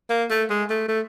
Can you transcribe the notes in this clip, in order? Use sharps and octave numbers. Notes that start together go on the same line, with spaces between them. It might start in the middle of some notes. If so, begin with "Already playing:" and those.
A#3
A3
G#3
A3
A3